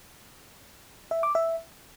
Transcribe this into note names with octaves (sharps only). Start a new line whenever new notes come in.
E5
D6
E5